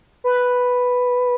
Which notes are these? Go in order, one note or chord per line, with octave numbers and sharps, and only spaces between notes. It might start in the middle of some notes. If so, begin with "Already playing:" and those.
B4